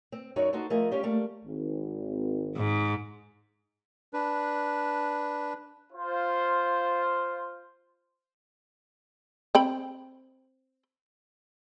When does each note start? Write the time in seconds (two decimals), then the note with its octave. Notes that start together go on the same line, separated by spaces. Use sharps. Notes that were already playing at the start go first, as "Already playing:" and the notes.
0.12 C4
0.36 F#2 D#4 F#4 C#5 D5
0.53 D#4 F#4 A4 C5
0.70 F3 A3 G#4 A#4 D#5
0.91 G3 C#4 F4 G4
1.03 G3 A3 A#3
1.44 G#1
2.56 G#2
4.13 D4 B4
5.93 F4 C5
9.55 C4 G5 B5